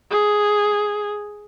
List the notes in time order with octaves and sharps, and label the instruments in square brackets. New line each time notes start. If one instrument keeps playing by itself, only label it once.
[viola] G#4